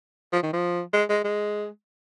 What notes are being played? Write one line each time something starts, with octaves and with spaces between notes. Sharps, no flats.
F3
D#3
F3
G#3
G#3
G#3